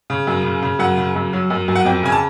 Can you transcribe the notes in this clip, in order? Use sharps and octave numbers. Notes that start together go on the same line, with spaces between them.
C#3
F#2
C#3
C#3
F#2 F#5
C#3
F#2
F#3
F#2
F#2
F#5
F2 G5
C#3 G#5
A5